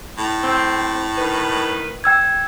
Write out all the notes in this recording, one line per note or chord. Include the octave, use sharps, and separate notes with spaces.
A2
C4
D#3 B4
G5 E6 G#6